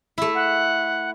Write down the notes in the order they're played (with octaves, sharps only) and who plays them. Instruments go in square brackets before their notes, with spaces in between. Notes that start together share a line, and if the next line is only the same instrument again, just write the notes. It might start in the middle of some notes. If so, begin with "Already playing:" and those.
[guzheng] A3 E4
[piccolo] F#5